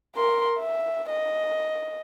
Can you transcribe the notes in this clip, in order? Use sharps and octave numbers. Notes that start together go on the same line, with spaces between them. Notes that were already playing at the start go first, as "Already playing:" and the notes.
A#4 C6
E5
D#5